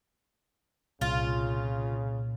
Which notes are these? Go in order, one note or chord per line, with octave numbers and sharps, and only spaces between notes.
C2 A#2 C#3 F4